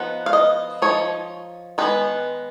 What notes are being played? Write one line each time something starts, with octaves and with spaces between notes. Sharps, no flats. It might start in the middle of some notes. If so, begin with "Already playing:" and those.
Already playing: F3 B3 D#4 F#5
F5
D#5
F3 A#3 D#4 C#5
D#3 G#3 B3 B4